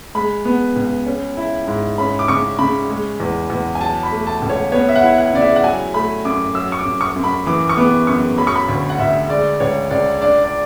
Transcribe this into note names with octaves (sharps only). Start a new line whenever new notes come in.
G#3 B5
B3
C#2
C#4
E4
G#2
C#4 B5
D6
C#3 C#6
C#3 B5
G#3
E2
E2
G#5
F#3 A5
B5
A3
A5
C#2
C#5
B3 C#5
E5
F#5
E4
F#5
C#3 D5
E5
F#5
F#3 G#5
A3 B5
F#2 D6
F#3 E6
C#6
D6
F#2
C#6
F#2
B5
E3 D6
C#6
B3 D6
F#2 C#6
F#3 B5
C#6
B5
D2
F#5
D2 E5
G#3 D5
C#2 C#5
C#2 D5
D4 D5
D5